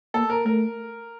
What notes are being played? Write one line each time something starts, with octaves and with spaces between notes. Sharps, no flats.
A#3 A4
A#4
A3 A#4